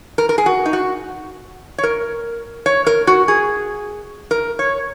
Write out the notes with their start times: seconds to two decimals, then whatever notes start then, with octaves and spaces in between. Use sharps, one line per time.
0.18 A#4
0.29 A#4
0.38 G#4
0.46 F#4
0.66 D#4
0.73 F#4
1.78 C#5
1.83 A#4
2.66 C#5
2.87 A#4
3.07 F#4
3.28 G#4
4.31 A#4
4.59 C#5